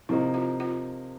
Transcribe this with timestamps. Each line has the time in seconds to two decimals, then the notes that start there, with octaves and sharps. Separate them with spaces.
0.09 C3 F3 A#3 D#4 E4
0.34 F4
0.60 F4